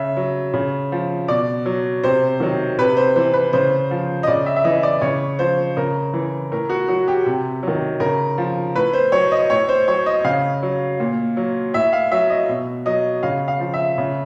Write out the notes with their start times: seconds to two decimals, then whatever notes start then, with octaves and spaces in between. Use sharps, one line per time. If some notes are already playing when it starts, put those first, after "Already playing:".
Already playing: C#3 E5
0.17 F#3
0.54 C#3
0.92 F3
1.28 B2 D5
1.66 F#3
2.04 C3 C5
2.40 D#3 F#3
2.78 C3 B4
2.97 C5
3.16 E3 C5
3.34 B4
3.53 C#3 C5
3.91 F3
4.23 D#5
4.27 C#3 D5
4.46 E5
4.56 E5
4.64 E3 D#5
4.83 D5
5.02 C#3 C#5
5.39 F3 C5
5.77 C#3 A#4
6.13 E3
6.51 A2 A#4
6.69 F#4
6.88 F#3 F#4
7.08 G4
7.26 C3
7.63 D#3 F#3
8.00 C#3 A#4
8.38 F3
8.75 A2 B4
8.93 C5
9.12 F#3 C#5
9.32 D#5
9.50 A2 C#5
9.69 C5
9.88 F#3 C#5
10.06 D#5
10.25 C#3 F5
10.63 F#3
11.00 A#2
11.37 F#3
11.74 A2 E5
11.93 F5
12.12 F#3 E5
12.30 D#5
12.49 B2
12.86 F#3 D#5
13.23 C#3 F5
13.48 F5
13.60 F3
13.74 E5
13.98 C#3